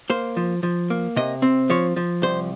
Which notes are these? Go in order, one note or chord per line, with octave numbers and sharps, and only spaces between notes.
A#3 C5
F3
F3
A#3
C3 D#5
C4
F3 C#5
F3
C2 C5